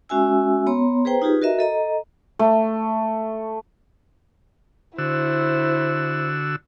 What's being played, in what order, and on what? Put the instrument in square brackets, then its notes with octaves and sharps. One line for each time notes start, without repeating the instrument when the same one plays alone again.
[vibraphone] G#3 C#4 F#4 E5 G#5 E6
B3 C#5 A#5 C6
G#4 B4 C5 G5 A#5
D#4 F4 G4 G#4 B4
F#4 A#4 D#5 E5 A#5
A4 D#5 A#5
[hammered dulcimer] A3
[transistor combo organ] D3 F#4 E6 [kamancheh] E4 C5